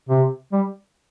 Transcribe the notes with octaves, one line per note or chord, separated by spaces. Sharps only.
C3
G3